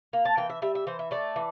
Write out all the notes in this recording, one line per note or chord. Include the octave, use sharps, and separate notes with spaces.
A#3
A5
E3 G5
E5
G3 E5
E5
E3 C5
E5
A3 D5
E3